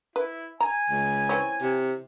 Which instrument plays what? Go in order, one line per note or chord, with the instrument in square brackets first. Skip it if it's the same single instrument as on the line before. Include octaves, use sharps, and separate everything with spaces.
[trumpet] E4 [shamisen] B4
[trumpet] G#5 [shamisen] A#5
[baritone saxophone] C#2
[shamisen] E3 C4 C#4
[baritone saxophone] C3